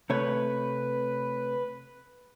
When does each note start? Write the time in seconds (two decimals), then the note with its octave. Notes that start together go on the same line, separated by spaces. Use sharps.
0.10 C3 A3 B4 C#5